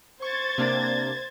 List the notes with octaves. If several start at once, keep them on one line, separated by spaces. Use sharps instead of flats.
C5 C#6 G#6 A6
C3 A#3 D4